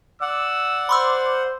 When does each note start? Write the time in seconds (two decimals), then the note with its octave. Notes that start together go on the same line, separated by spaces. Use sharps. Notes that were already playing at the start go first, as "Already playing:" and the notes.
0.22 D5 F#5 E6
0.89 C5 B5 C6 E6